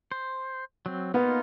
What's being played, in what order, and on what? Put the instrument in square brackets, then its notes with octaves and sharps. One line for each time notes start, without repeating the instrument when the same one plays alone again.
[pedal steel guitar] C5
F#3 C4
[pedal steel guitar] A#3 D#4 F4 [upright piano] B3